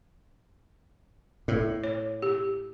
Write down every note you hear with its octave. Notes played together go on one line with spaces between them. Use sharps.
A2
C#5
G4